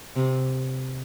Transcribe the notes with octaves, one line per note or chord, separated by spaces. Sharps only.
C3